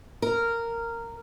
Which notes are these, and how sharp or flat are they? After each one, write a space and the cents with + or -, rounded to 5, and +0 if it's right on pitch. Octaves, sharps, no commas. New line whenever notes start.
A#4 -10